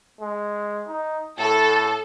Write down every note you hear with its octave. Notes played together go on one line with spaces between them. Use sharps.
G#3
D#4
A2 A4